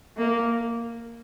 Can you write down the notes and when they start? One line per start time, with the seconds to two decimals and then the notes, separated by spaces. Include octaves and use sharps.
0.17 A#3